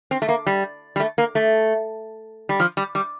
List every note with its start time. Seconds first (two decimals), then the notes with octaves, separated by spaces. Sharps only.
0.11 C4
0.22 A3
0.29 A#3
0.47 G3
0.96 G3
1.00 A3
1.18 A#3
1.35 A3
2.49 G3
2.60 F3
2.77 G3
2.95 G3